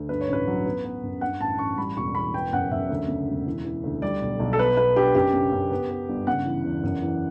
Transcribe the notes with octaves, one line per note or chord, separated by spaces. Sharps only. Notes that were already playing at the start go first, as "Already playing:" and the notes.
Already playing: D2
G2 B4
C#5
A1 B4
F#3
B3
B3
F#2
G2 F#5
A1 A5
A1 C#6
G3 B5
E1 C#6
E2 B5
B3 G5
F#2 F#5
F#2 E5
D2
C#3
E1
E3
E3
D2
G3 D5
B1
B1
A4
B3 B4
B3 B4
D4 G4
F#2 G4
C#3
F#2
B3
B3
G1
C#3 F#5
E3
E2
F#2
E3